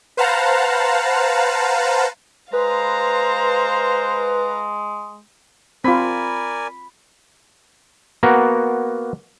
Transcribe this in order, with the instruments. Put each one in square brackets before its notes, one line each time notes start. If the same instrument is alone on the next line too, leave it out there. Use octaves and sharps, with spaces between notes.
[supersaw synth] B4 C5 F5 F#5 A5 A#5
[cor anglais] G#3 [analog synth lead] B4 [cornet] C5 [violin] F5 A#5
[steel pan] C4 F4 [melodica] A#4 D5 G#5 [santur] B5
[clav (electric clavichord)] A#3 B3 F#4 A#4